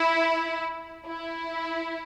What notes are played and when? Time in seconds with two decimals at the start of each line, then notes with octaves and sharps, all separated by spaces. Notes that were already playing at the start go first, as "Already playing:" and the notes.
Already playing: E4
1.08 E4